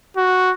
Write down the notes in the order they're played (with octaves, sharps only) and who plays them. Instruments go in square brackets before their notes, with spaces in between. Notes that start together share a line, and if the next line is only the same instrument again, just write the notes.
[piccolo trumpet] F#4